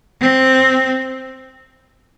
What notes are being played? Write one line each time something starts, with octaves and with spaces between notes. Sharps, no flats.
C4